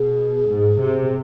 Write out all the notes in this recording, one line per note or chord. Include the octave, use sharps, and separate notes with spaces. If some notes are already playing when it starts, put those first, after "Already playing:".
Already playing: B2 G#4
G#2
C3